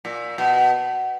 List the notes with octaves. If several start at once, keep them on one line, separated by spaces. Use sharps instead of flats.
A#2
B2